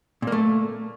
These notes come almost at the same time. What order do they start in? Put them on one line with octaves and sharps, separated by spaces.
A#2 A#3 A3